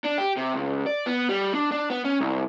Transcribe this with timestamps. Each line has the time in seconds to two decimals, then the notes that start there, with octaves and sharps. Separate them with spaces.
0.05 D4
0.18 G4
0.37 C3
0.54 C#2
0.86 D5
1.06 B3
1.29 G3
1.55 D4
1.72 D4
1.90 B3
2.05 C#4
2.20 C2